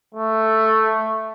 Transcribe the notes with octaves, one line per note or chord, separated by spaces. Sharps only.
A3